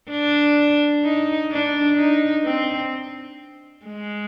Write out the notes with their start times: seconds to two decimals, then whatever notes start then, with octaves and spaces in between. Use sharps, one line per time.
0.11 D4
1.04 D#4
1.51 D4
1.97 D#4
2.44 C4
3.86 G#3